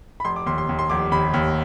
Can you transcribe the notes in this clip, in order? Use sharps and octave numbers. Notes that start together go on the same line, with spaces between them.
B5
F1 C6
D6
D#2 C6
C6
D#2
C6
F1 D6
D#2 B5
D#2